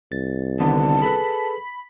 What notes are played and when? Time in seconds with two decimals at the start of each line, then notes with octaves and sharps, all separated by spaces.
0.12 C2 A6
0.60 D3 D#3 B3 A5
1.02 G#4 A4 B4 B5